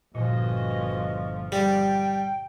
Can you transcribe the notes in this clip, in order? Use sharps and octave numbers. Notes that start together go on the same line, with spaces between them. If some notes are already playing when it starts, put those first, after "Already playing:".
G1 A#2 E3 F3 F#4 D#5
G3 G5